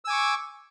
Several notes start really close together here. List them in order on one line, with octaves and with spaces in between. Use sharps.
E6 G#5 D6 C#6